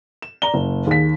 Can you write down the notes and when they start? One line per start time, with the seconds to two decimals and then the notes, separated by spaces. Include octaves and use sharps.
0.22 E7
0.42 D5 A#5 G7
0.54 F#1
0.87 D#2 G#4 B6